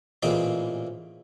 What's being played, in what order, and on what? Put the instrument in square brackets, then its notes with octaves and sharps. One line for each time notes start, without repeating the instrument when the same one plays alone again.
[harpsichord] A1 A#2 E3 G#3 C4 G5